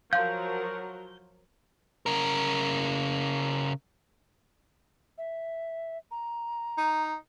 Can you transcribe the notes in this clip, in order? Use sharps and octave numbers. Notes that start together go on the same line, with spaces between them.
F3 F#3 A#4 F5 C6 G6
C#3 A#4
E5
A#5
D#4